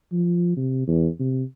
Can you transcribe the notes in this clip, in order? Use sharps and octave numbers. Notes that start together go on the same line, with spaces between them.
F3
C3
E2
C3